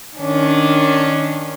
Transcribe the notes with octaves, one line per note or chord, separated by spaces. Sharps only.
D#3 C#4 D4